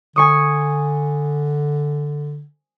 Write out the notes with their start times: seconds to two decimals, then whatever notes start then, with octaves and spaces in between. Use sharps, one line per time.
0.16 D3 G#5 C#6 D#6